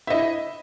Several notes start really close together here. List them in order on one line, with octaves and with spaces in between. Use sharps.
E5 D#5 E4